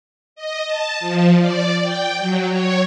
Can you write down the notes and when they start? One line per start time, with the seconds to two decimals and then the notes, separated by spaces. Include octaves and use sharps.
0.36 D#5
0.65 A5
1.00 F3
1.39 D5
1.82 G5
2.19 F#3
2.50 C#5